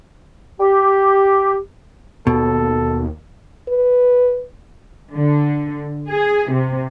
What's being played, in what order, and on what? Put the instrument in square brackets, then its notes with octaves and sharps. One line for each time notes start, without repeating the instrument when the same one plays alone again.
[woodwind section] G4
[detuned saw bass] D#2 [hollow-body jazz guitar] B2 [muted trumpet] A4
[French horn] B4
[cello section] D3
G#4
C3